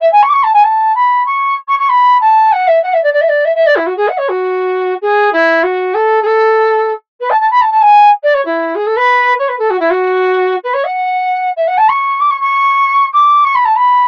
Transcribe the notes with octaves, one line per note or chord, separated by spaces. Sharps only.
E5
G#5
C#6
D6
C#6
A5
G#5
A5
B5
C#6
C#6
C#6
B5
A5
F#5
E5
F#5
E5
D5
D5
E5
D5
E5
E5
D5
E4
F#4
G#4
F#5
C#5
F#4
G#4
E4
F#4
A4
G#4
A4
B4
A5
A5
B5
A5
A5
G#5
D5
C#5
E4
G#4
A4
B4
C#5
B4
A4
F#4
E4
F#4
B4
C#5
F#5
E5
F#5
A5
C#6
D6
C#6
C#6
D6
C#6
B5
A5
B5